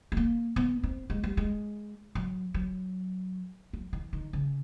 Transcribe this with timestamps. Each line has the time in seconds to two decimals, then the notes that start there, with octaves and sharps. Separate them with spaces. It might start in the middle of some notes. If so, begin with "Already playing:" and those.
0.12 A3
0.17 A#3
0.56 B3
0.83 C4
1.10 G#3
1.24 G3
1.37 G#3
2.15 F#3
2.54 F#3
3.73 F#3
3.93 E3
4.13 D#3
4.33 C#3